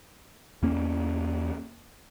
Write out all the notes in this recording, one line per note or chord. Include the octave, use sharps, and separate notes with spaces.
E2 A#3 C#4